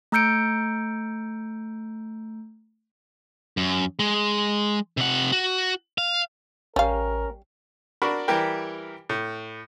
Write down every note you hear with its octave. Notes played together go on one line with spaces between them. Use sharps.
A3 A#5 E6 G6 C#7 D7
F#2
G#3
C3 F#5
F#4
F5
A1 G3 C#4 A#4 F5
D4 F#4 A#4 B5 C#6
E3 G3 G4 A#4 G5
A2